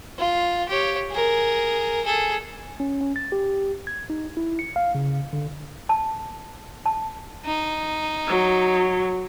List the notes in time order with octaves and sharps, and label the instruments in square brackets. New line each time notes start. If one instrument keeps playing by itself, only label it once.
[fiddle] F4
G4 C#5
G#4 A#4
G#4 A4
[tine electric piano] C#4
C#4
A6
G4
G#6
D#4
E4
C#7
F5
C#3
D3
[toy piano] A5
A5
[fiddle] D#4
[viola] F#3